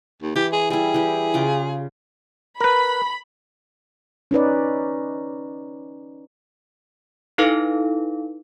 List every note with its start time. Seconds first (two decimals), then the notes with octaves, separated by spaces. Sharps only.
0.22 D#2
0.36 E3 G4
0.52 G#4
0.70 G3 E4 G#4
0.94 E3 G4
1.34 C#3 F4 D6
2.60 A#4 B4 B5
4.31 C#4 D#4 B4 D5
7.38 D#4 E4 A4 B4 F5